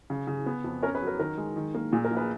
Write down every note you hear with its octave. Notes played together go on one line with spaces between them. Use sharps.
C#3
C#3
B3
F2
C#4 A#4 C#5
G#4 B4
F#3
A#4
D#3 A#4
G#3
D#3
A#3
A#2 G#4
A#4
A#1
G#4 B4